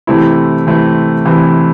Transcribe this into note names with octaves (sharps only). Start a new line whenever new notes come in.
C3 E3 A3 C4 E4
C3 E3 A3 C4 E4
C3 E3 A3 C4 E4